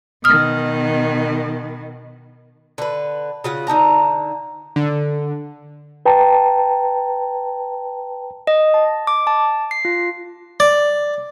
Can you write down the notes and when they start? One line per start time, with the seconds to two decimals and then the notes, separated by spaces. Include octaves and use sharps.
0.24 B2 D#3 D#6 F6
2.78 D3 B4
3.44 C#3 F4 F#5
3.67 D3 D#4 A5 A#5
4.76 D3
6.06 B4 G5 A5 A#5
8.47 D#5
8.74 A5
9.07 D6
9.27 A5
9.71 C7
9.85 F4
10.60 D5